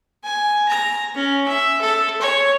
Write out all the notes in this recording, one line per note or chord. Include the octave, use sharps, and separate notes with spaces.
G#5
A#5
C#4
E5
A4
C#5